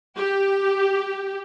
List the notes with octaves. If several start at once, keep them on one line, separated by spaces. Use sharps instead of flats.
G4